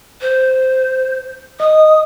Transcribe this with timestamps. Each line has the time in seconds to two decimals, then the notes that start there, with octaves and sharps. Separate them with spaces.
0.21 C5
1.60 D#5 D#6